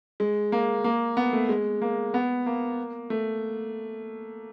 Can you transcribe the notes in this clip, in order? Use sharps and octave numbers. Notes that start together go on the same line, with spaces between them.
G#3
A#3
A#3
B3
A3
G#3
A#3
B3
A#3
A3